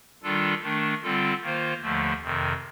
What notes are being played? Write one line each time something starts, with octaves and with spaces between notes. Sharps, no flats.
D#3 G3 D4 F4 A4
D#3 A3 D4
D3 G3 C4 F4 A4
D#3 A#3 F4 C5
D#2 D3 F3 A3
F2 C3 D#3